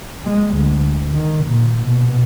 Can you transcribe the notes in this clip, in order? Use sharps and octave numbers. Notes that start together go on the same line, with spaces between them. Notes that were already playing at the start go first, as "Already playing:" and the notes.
G#3
D2
D#3
A#2
B2